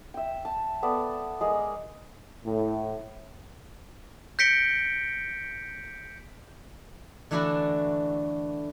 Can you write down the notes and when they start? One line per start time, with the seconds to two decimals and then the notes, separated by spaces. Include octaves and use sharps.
0.14 E5 G5
0.45 A5
0.83 B3 A4 D5
1.41 G#3 G#4 A#4
2.44 A2
4.39 G6 A#6 B6 C#7 D7 G7
7.31 D3 E3 A3 D4 E4 F#4